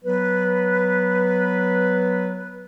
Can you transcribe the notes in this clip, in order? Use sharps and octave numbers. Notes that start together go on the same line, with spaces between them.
F#3 B3 B4